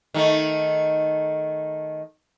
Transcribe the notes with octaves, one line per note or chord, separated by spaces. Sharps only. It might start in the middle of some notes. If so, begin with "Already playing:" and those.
D#3 A3